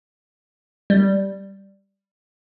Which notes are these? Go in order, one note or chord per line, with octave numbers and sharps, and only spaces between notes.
G3